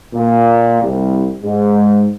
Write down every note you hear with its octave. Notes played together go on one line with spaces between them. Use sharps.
A#2
C2
G#2